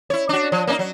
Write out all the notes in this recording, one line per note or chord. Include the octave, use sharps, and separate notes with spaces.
E4 C#5
D4 F#4
F3
A#3 C#4 D#4
F#3